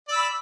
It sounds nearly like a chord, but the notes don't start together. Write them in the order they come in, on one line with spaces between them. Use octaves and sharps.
D5 E6 B5